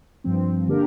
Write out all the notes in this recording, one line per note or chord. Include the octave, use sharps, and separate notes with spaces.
G2 F3 C4
D3 A#3 D4 G4 A#4